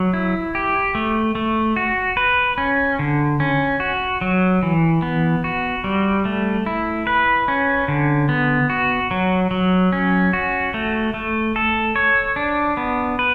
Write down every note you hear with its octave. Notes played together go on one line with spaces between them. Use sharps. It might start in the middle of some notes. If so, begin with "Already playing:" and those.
Already playing: F#3
E4
G4
A3
A3
F#4
B4
C#4
D3
C#4
F#4
F#3
E3
B3
F#4
G3
A3
E4
B4
C#4
D3
B3
F#4
F#3
F#3
C#4
F#4
A3
A3
A4
C#5
D4
B3
B4